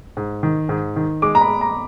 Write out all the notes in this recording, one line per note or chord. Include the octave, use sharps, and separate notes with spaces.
G#2
D#3
G#2
D#3
G#3 D6
A#5
B5
G#3
A#5